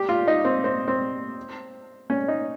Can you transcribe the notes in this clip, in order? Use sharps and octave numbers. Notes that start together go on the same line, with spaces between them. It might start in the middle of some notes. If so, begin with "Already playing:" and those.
Already playing: G4
F4
D#4
C4
C4
C4
C#4
D#4